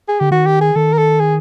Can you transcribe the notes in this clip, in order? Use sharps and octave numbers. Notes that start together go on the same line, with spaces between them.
G#4
D3 G4
D#3 F#4
G4
G#4
D#3 A4
A#4
A4
G#4